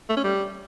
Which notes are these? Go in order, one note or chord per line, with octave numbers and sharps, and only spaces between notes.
A3
C#4
G3